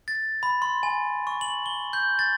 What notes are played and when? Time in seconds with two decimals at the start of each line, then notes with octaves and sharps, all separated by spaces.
0.08 A6
0.43 B5
0.62 C6
0.83 G#5
1.27 C#6
1.41 F#7
1.66 G7
1.93 G6
2.19 A6